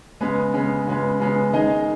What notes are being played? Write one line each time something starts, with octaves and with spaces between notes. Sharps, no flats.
C#3 G#3 B3
C#3 G#3 B3
C#3 G#3 B3
C#3 G#3 B3
D#3 G#3 D#4 G#4 D#5